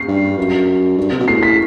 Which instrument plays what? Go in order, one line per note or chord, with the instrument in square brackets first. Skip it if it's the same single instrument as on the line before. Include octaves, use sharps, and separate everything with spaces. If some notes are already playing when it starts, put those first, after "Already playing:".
Already playing: [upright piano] C7
[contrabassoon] G2
F#2
G2
C3
B2
[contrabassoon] A2 [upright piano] C7
[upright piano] B6